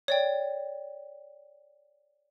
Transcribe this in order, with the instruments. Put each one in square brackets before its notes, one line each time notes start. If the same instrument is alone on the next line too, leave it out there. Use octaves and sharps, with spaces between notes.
[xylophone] C#5 D5 G5